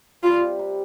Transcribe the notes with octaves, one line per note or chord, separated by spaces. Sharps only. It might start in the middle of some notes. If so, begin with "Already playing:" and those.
G3 F4
C3
C3